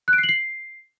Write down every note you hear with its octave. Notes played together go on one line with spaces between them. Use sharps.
F#6
D7
C7
F#7
C7